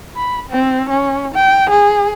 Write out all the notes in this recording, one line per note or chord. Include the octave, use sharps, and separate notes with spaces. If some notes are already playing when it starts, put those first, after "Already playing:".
B5
C4
C#4
G5
G#4